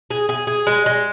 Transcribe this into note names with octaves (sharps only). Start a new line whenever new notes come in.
G#4
G#4
G#4
G#3
G#3